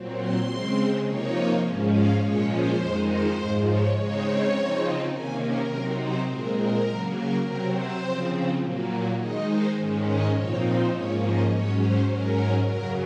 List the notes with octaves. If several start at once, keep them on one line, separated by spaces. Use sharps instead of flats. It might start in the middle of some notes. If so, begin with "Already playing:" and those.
Already playing: A#2 F#3 C4
C6
C#3 G#3 C4
C3 F3 A#3 D#4 C#5
G#2 F3 G#3 C#4
F5
A#2 F3 G#3 C#4 C#5
C5
F2 D#3 G#3 D#4
C5
G#2 F3 G#3
C#5
C#3 G#3 C4 D#4 C#5
C#3 F3 C4 D#4
C3 D#3 A#3 C#4 G#5
A#4
C3 F#3 C4 D#4
C5
A#2 G#3 C4 A#4
A#4
C#3 F#3 A#3
A#4
C3 F#3 C4 A#4
C5
C#3 F3 C4
A#2 F#3 A#3
D#3 G#3 D#4 D#5
C5
G#2 D#3 G#3 C#4
D#5
A#2 F3 C4 D#4 C#5
C5
G#2 F3 A#3 C#4 C#5
D#5
G#2 F#3 C#4 C#5
C5
G#2 F#3 C#4 A#4
F#2 C#3 F#3 A#4